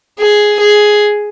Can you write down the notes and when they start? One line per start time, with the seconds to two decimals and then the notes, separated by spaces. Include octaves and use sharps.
0.19 G#4
0.61 G#4